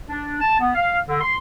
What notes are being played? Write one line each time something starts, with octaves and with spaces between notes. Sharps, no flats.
D4
A5
B3
F5
D3
C6